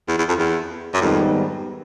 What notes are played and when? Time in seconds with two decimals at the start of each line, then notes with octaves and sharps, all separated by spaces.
0.08 E2
0.18 E2
0.28 F2
0.39 E2
0.94 F#2
1.01 F2 G#2 D#3 G3 B3 D#4